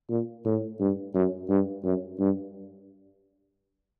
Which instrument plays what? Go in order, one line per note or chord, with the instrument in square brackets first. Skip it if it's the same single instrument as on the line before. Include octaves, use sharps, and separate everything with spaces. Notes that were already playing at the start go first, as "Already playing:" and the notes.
[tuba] A#2
A2
G2
F#2
G2
F#2
G2